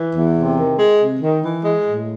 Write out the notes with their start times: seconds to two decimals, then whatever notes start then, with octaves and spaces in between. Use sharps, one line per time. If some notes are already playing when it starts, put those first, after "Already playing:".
Already playing: E3
0.14 E2
0.35 C3
0.57 D#3
0.78 G#3
0.99 C3
1.21 D#3
1.41 E3
1.63 G#3
1.85 A2